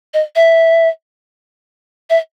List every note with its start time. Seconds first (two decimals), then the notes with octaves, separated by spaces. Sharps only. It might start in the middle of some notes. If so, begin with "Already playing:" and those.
0.14 D#5
0.36 E5
2.10 E5